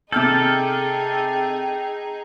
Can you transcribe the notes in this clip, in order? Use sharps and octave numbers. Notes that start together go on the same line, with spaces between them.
C3 D#4 G#4 A4 G5 F6 G6